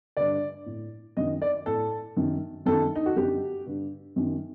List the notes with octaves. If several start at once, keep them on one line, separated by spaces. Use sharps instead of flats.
G2 D3 D5
A2
F#2 D#3 D#5
D5
A2 A4
F#2 D#3
F#2 D#3 A4
D#4
F#4
F#2 D3 G4
G2 D3
F#2 D#3